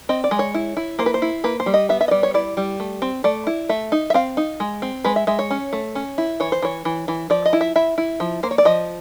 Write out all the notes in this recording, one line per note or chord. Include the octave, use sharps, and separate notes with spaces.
C4 D#5
D5
G#3
C#5
E4
E4
A#3 C5
B4
C5
E4
A#3 B4
C5
G3
D#5
B3 E5
E5
D#5
G3 D5
C#5
E4 D5
G3
A3
C4
A3 D5
E4
A3 E5
D#4
E5
C4 F5
D#4
G#3
C4
G#3 B4
E5
G#3 E5
C#5
C#4
A3
C#4
E4
E3 C#5
C5
E3 C#5
E3
E3
F3 D5
D#5
E4
E5
E4 E5
E4
F3
A#3 C5
C#5
D5
F3 D#5